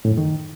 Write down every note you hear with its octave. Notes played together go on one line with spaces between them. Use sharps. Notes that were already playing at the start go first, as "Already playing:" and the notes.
A2
F#2
D#3